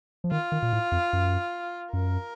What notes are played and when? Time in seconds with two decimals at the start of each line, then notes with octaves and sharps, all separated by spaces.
0.24 F3
0.31 D#3 F4
0.52 D#3
0.62 A#2
0.73 A2
0.92 F2
1.13 F#2
1.93 F#2 A#4